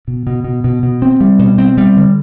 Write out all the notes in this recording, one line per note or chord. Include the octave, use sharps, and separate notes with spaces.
B2
B2
B2
B2
B2
C4
G3
B2
C4
G3
D3